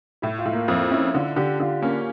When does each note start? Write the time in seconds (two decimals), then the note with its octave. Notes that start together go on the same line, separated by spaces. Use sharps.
0.22 A2 E4
0.38 F4
0.45 A2
0.53 A#3
0.68 F2
0.91 C#4 E4
1.14 D3 F4
1.36 D3 G4
1.60 D3 F4
1.82 A#3 C#4